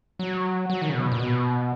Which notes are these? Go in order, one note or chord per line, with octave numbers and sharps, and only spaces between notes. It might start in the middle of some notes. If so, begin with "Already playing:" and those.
F#3
F#3
D#3
C#3
B2
A#2
B2